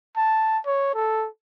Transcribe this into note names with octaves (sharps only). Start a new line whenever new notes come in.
A5
C#5
A4